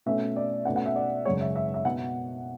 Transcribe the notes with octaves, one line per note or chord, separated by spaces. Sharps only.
B2 A3 C#4 E5
D5
B2 A3 C#4 F#5
F#5
E5
D5
F#2 C#3 G#3 C#5
E5
E5
E5
B2 F#5